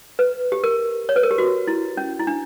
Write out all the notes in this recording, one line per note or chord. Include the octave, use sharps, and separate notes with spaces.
B4
G4
A#4
C#5
B4
A#4
G4
F#4
E4
C#4
E4
D4